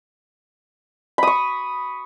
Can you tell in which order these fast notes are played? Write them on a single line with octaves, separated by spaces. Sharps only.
B5 D#6 C#6